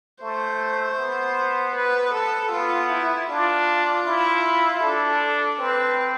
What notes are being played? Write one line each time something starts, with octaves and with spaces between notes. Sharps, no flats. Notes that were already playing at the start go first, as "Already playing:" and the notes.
A3 C5
B3
B4
A4
B3 F4
E4
D4 F4
E4
D4 A4
C4 B4